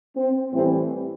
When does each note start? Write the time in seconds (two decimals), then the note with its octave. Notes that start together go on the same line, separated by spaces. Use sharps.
0.17 C4
0.53 A2 E3 G3 C4